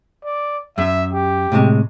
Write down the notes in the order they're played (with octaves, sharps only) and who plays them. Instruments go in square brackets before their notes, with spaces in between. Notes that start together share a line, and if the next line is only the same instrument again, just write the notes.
[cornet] D5
[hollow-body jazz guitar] F#2 [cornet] E5
[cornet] G4
[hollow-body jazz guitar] A2 C3 G#3